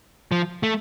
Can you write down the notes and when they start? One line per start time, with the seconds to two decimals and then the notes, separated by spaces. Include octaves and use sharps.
0.32 F3
0.63 A3